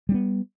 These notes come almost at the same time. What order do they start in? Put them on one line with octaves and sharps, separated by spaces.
G3 C#4 B3